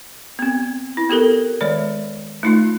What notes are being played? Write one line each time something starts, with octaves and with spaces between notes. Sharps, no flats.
B3 C4
E4
B3 G4 A4 A#4
D#3 G#3 C#5 D5
A3 D#4 F4